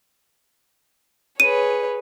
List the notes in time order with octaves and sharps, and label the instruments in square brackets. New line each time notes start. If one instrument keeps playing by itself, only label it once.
[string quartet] G#4 B4 C#5 [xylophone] D#7